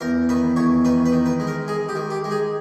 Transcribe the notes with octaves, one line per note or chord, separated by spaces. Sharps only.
E2 A#4
D#3 B4
E2 C#5
D#3 B4
B4
D#3
B4
G#3
A#4
G#3 G#4
G4
D#3
G4
G#3
G#4